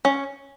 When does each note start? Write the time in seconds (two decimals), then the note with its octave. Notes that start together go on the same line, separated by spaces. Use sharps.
0.05 C#4